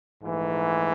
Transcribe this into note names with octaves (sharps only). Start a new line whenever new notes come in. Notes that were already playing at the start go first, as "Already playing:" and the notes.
A#1 G#2 E3 A3